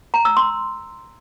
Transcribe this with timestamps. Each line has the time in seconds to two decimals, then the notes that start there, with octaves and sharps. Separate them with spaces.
0.14 A#5
0.25 E6
0.37 C6